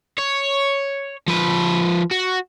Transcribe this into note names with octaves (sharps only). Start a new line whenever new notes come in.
C#5
F3 B4
F#4